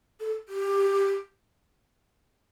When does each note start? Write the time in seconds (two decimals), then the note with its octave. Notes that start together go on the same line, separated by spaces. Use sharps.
0.20 A4
0.49 G4